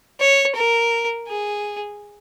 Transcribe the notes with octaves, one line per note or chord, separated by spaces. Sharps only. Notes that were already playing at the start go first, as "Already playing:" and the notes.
C#5
A#4
G#4